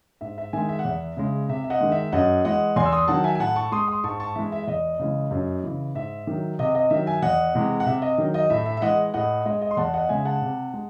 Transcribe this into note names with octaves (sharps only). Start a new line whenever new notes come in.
G#2 E5
E5
D#3 G#3 E5 G#5
E5
F#5
E2 E5
C#3 G#3
C3 E5
E5
D#5 F#5
D#3 G#3
E5
F#2 D#5 F#5
E3 G#3 D#5 F#5
E2 G#5 C6
E6
C6 D#6
D#3 F#3 F#5 A5
E5 G#5
G#5
A2 F#5 A5
A5 C#6
G#3 C6 D#6
C6 D#6
G#2 A5 C#6
A5 C#6
E3 G#3 E5
E5
E5
E2 D#5
C#3 E3 G#3
F#2
C#3 E3
G#2 E5
D#3 F#3
C3 D#5
D#5
D#3 F#3 E5
E5 G#5
E2 D#5 F#5
C3 E3 G#3
F#5
C3 E5
D#5
D#3 F#3
D#5
A2 E5
E5
E5
E3 G#3 D#5 F#5
A2 D#5 F#5
G#3 D#5
D#5
C6
E2 F#5 A5
D#5 F#5
C#3 G#3 E5 G#5
F#5 A5
C3
G#3